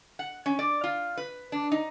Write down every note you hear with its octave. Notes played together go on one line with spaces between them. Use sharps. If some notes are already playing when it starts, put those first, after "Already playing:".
F#5
C#4
D5
F4
B4
D4
D#4